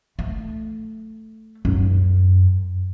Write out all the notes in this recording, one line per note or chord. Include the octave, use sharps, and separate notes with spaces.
A3
F#2